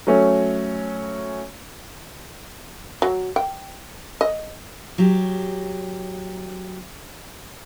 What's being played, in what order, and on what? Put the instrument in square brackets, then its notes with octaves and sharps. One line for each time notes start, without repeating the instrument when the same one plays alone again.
[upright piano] F#3 A3 C#4
[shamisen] F#3
G5
D#5
[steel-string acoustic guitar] F#3 G4